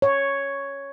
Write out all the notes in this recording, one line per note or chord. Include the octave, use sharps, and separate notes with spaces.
C#5